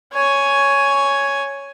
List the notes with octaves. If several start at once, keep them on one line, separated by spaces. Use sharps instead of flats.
C#5 G#5